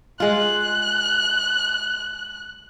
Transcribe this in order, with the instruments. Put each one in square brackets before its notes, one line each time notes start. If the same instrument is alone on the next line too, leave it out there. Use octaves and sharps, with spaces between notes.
[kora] G#3 F4 [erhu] F#6